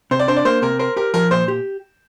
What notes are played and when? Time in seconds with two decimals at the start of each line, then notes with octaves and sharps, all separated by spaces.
0.11 C3 C5
0.19 D5
0.28 D4 C5
0.36 D5
0.45 A#3 C5
0.62 C3 A#4
0.79 A#4 C5
0.96 G4 A#4
1.14 F3 A#4
1.31 A#2 C5
1.48 G4